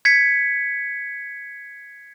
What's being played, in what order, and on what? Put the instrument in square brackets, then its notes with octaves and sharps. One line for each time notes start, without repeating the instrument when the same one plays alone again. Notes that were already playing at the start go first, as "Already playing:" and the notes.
[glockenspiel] G#6 B6 C#7